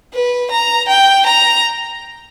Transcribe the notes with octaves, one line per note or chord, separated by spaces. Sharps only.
B4
A#5
G5
A#5